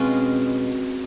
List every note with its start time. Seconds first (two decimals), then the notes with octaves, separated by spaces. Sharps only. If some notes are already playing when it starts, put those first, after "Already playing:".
Already playing: B2 G#3 C4 C#4 F4